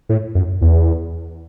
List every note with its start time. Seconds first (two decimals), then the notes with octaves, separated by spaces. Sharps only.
0.09 A2
0.35 F#2
0.61 E2